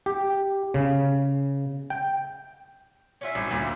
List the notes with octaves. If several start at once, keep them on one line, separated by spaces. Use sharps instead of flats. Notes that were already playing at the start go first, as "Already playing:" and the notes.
G4
C#3
G5
C#4 F4 E5
G#1
D2 A#2